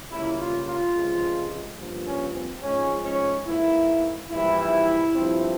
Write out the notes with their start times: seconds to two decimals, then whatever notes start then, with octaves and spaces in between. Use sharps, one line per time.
0.10 C#2 C#3 G3 A#3 E4
0.39 F4
0.66 F4
0.94 C#2 C3 F3 G#3
1.78 G2 F3 A#3
2.06 C#4
2.35 C4
2.62 G#2 F3 G#3 C#4
3.05 C#4
3.47 G#2 E3 A#3 E4
4.30 A#1 G#2 E3 G3 E4
5.14 G2 F3 C4